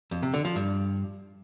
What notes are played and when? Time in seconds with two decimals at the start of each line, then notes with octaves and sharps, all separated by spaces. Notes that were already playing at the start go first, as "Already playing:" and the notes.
0.11 F2
0.22 C3
0.34 D3
0.45 F3
0.56 G2